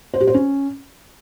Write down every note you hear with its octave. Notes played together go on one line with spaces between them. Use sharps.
C5
G4
C5
C#4